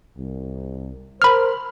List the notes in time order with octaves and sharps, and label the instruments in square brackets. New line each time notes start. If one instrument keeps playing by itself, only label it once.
[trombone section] C2
[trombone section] A#4 C5 [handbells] B5 F6